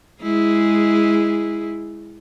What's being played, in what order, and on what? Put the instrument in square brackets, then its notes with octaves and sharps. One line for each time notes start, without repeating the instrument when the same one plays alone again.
[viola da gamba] G#3 E4 G#4